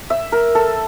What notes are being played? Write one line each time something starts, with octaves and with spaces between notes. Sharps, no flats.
E5
A#4
A4